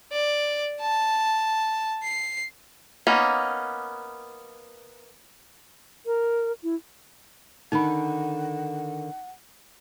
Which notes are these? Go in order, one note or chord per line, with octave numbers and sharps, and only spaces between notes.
D5
A5
C7
A#3 B3 C#4 D#4
A#4
E4
D3 D#3 D#4 F#5 B5